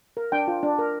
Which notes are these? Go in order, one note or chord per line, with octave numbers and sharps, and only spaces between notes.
A#4
D4 G5
F4
D4
A#4